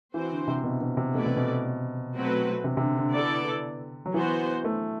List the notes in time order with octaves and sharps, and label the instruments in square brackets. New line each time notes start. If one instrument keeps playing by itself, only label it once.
[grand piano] E3 [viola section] C4 F#4 C5
[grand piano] D3
C3
B2
B2
C3
[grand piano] B2 [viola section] A3 E4 B4 D5
[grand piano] C3
B2
[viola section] F#3 A3 C4 F#4 B4
[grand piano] C3
C3
D3
D3
[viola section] B3 E4 A4 D5
[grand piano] F#3
[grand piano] E3 [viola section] B3 F#4 C5
[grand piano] A3